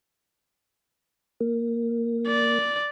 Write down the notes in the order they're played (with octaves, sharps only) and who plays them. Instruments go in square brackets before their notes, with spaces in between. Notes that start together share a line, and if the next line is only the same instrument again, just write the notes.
[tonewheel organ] A#3
[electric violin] D5